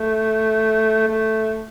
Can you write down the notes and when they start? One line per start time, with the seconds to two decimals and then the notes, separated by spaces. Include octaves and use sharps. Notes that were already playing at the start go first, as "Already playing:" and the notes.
Already playing: A3
1.08 A3